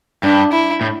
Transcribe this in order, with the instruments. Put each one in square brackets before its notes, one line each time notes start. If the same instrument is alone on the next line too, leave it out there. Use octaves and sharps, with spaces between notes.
[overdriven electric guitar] G2 [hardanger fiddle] D4
[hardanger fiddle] E4
[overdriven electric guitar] A2